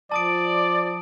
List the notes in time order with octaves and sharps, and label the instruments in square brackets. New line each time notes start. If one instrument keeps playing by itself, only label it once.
[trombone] F3 [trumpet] D5 [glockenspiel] A5 D#6 D7